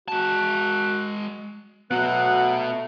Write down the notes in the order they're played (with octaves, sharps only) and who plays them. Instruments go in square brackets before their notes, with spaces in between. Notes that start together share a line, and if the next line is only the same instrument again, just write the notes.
[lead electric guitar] G#3 A5 [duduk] F#4
[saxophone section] F#3 B4 F#5 [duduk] A3 [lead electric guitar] B3 F#4